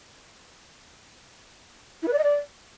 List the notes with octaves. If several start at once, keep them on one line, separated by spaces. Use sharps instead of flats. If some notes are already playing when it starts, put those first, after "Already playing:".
E4
B4
D5
D#5
D5